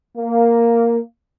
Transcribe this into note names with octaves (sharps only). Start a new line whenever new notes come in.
A#3